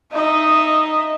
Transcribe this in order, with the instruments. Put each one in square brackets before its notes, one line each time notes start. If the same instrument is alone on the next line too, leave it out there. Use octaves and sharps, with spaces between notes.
[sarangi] D#4 [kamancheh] D#5 E5